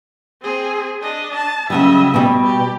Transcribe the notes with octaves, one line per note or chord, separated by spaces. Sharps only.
C4 G#4
D4 D#5
A5
C#3 F#3 G3 D#5 E5
B2 G3
G4